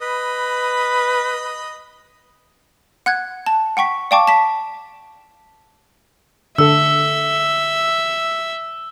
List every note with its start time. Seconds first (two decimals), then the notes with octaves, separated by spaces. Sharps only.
0.02 B4 D#5 B5
3.06 F#5 F#6 G#6
3.46 A5
3.77 F#5 G5 C#6 B6
4.11 D5 F5 G5 A5 C#6 D6
4.27 A5 B6
6.58 D3 A4 E5 E6